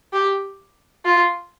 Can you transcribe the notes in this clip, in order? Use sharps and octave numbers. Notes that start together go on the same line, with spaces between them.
G4
F4